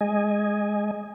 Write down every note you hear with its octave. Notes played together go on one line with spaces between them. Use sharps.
G#3 D#5 G#5